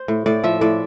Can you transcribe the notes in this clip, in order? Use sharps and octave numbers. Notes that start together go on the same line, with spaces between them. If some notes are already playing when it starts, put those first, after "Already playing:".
Already playing: C5
A2
A2 D5
F3 E5
A2 D5